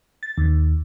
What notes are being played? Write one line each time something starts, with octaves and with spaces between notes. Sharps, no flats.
A6
D#2